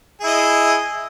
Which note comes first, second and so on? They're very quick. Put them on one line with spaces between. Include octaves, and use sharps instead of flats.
G#4 E4 D#5